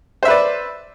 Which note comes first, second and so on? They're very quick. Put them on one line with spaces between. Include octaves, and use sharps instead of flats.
C5 E5 B4 D5